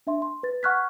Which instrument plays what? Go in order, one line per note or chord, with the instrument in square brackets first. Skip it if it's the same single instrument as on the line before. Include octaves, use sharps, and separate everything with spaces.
[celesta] D4 E5 C6
C6
B4 A6
F#5 C#6 F6 F#6 G#6 B6